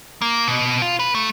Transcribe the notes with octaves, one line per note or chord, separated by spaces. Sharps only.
A#3
B2
F4
B4
A3